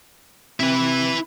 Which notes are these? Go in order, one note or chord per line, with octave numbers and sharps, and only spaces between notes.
C3 E4 B4